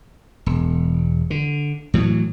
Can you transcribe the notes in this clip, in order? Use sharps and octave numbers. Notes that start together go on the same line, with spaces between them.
E1
D3
A2 E3 F#3